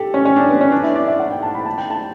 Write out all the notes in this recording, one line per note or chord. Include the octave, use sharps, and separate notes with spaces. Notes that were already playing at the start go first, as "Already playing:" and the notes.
Already playing: G4 A4
C#4
C#4
D4
B3
C#4
D4
E4
D5
E5
F#5
G5
A5
B5
A5
G5
A5